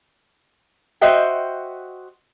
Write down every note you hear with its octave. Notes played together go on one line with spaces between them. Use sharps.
F#4 C5 D#5 E5 G5